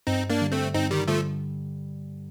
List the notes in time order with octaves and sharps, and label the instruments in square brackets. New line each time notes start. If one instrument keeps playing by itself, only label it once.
[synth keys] G2 [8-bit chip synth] C4 D#4
[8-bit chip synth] A#3 D4
[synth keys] D3 G3
[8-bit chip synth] A3 C4
[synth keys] G2 [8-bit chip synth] C4 D#4
[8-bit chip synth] D#3 G3
[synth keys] D3 G3 [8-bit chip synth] F3 A3